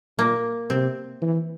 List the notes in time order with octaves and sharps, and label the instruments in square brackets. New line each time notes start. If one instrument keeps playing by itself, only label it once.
[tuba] A#2 [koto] A#3
[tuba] C3 [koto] C4
[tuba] E3